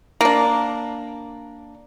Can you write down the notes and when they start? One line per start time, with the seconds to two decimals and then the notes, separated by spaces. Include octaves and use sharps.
0.21 A#3 D4